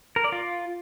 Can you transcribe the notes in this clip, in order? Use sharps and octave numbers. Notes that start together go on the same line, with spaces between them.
A#4
D5
F4